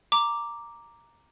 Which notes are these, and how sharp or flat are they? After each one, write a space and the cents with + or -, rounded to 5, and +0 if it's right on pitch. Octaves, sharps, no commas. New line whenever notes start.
A#5 +0 D6 +0